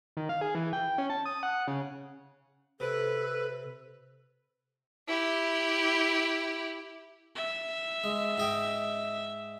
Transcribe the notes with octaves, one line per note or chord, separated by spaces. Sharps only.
D#3
F5
G#4
E3
G5
C#4
A5
D#6
F#5
C#3
C3 A4 B4
E4 G4
E5
G#3
G#2 D#5 G5